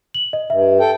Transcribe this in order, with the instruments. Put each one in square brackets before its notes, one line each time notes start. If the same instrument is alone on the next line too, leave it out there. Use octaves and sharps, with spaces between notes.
[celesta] F#7
D#5
[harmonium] G2 [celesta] E5
[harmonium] A4 G5